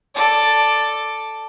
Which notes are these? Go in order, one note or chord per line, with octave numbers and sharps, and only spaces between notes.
A4 D5